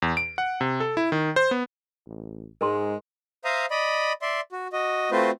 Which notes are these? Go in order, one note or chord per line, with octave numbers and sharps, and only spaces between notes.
E2
D7
F#5
C3
A4
E4
D#3
C5
B3
A1
G#2 G#3 A#4 A#5 C6
C5 E5 F5 A#5 D#6
D5 D#5 B5
D5 E5 C6
F#4
F#4 D#5
A3 C4 F4 F#4 B4 C5